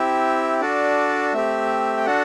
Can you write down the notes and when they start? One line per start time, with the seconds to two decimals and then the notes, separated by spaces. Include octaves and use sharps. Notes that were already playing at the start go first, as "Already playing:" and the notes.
Already playing: C4 E4 G4 E5
0.61 D4 F#4 A4 D5
1.33 A3 C4 G4 E5
1.97 G5
2.06 D4 F#4 A4 F#5